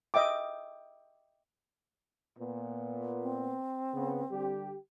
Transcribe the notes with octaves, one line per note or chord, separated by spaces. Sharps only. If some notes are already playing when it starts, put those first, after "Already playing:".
D#5 E5 G5 D6
A#2 B3
C4
C#3 B3
D3 G3 G4